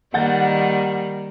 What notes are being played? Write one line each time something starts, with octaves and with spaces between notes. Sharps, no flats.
D#3 G3 A#3 F#5 G6 A6